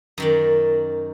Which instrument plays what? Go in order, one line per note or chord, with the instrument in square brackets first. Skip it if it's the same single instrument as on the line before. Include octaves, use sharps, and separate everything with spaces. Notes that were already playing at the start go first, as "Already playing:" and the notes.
[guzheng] F#2 D#3 D5